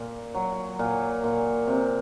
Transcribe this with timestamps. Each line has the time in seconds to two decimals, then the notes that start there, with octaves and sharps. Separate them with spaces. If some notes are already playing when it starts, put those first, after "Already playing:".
Already playing: A#2
0.35 F#3
0.79 A#2
1.24 A#2
1.68 C3